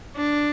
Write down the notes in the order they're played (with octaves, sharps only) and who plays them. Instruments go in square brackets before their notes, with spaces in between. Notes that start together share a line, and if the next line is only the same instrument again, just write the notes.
[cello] D4